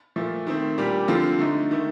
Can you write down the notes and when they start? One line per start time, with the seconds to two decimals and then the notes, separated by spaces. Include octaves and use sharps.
0.16 A#2 F3 A3
0.47 D#3 A3 C4
0.78 A#2 G3 D4 G4
1.08 D3 F3 C4 F4 A4
1.39 D3 A3 D#4
1.71 D#3 A3